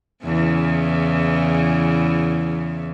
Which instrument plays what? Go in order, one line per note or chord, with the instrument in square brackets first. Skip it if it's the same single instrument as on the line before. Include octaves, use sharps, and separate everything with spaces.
[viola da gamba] E2 C#3 E3